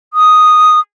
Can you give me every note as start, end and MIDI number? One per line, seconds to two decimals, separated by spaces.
0.14 0.80 87